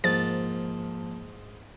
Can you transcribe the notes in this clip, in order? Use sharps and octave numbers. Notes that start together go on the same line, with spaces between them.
G#2 F3 A#3 A6